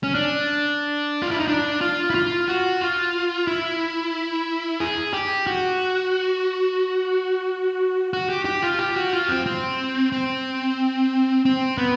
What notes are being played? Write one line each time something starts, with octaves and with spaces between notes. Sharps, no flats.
C#4
D4
F4
E4
D#4
D4
F4
E4
F4
F#4
F4
E4
G#4
G4
F#4
F#4
G4
G4
F4
G4
F#4
F4
C4
C4
C4
C4
B3